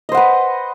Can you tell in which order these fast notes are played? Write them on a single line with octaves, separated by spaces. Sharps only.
D#5 C5 F#5 B4